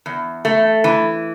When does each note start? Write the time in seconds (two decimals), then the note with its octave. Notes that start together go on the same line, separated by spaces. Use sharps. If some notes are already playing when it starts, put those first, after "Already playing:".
0.06 E2
0.45 A3
0.84 E3